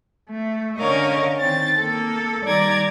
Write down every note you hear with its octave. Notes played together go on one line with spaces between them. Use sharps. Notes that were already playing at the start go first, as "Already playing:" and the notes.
A3
D3 C#4 A#4 C#5 D#5 F5
D#3 C4 A6
A#3 A4
D#3 G3 D5 A#5 D6 G#6